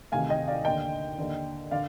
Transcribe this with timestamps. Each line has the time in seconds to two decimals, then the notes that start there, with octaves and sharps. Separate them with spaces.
0.12 D2 C3 D#3 F5 G#5
0.29 D#5 G5
0.47 D5 F5
0.65 D#2 D3 D#5 G5
1.18 D#2 D3
1.71 D3 D5 F5